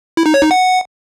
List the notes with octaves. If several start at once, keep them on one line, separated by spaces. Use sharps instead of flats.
E4
D#4
C#5
D#4
F#5